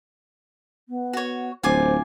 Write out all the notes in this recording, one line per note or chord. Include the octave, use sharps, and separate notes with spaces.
B3
F#4 C#5
D1 F4 C5 G#5 D6